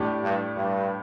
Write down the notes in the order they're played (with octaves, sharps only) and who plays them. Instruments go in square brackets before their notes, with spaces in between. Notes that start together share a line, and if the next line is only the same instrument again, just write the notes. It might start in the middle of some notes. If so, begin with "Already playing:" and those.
Already playing: [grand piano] A2 A3 D4 G4
[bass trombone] G2
G2